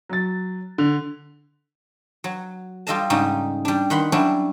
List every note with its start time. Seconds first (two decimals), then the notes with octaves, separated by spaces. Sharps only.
0.09 F#3 A6
0.78 D3
2.24 F#3
2.87 G3 F4 A4 D#5 F5 A5
3.10 G#2 C#3 G3 D#4
3.65 G3 D4
3.90 D#3 F#5 B5 C6
4.12 F#3 G3 C#4 D4 E4 F#4